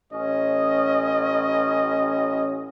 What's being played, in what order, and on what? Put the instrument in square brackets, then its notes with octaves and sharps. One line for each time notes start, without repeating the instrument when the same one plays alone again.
[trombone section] A1 C#4 [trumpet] D#5